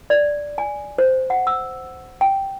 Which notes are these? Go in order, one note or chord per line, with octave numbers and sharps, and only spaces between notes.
D5
G#5
C5
F#5
E6
G5